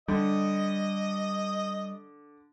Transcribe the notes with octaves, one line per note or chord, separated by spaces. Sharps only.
D3 G3 D#5